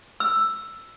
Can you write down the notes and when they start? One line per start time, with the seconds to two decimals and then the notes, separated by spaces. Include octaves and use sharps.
0.20 E6